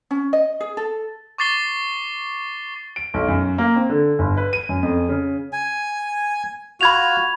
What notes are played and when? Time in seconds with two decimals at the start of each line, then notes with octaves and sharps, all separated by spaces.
0.11 C#4
0.33 D#5
0.61 G#4
0.77 A4
1.38 C#6 D6 A6 C7 G7
2.96 D7
3.14 B1
3.28 F#2
3.58 A#3
3.76 C4
3.90 D3
4.19 G1
4.37 B4
4.53 D#7
4.69 F#2
4.83 F2
5.09 C#3
5.53 G#5
6.81 F4 F#4 B5 G#6 F7